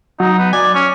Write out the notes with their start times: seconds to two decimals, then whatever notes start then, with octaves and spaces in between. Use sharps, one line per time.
0.20 F#3 D#4
0.38 B3
0.53 D5 G#5
0.75 C#4